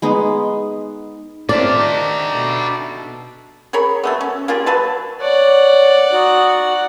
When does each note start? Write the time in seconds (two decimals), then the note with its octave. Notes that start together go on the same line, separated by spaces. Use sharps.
0.02 G#3 B3 D#4
1.49 C4 D4 F4 A#4 D5 E5
1.78 D#3 D#4 G4
2.31 B2 A4
3.73 G#4 A#4 C#5 B5
4.04 F#3 A3 B3
4.21 C#4
4.48 A#3 F4 G4 G#4
4.66 F#3 B4 A5
5.21 C#5 D5 F#5
6.12 D#4 F#4